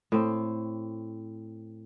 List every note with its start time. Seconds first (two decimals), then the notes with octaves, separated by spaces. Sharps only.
0.12 A2 C4